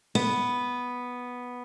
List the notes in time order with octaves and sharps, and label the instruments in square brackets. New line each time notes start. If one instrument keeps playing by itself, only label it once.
[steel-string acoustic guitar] B3